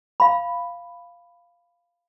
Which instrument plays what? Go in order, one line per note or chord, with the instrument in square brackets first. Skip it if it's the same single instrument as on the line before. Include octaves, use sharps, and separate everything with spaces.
[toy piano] F5 B5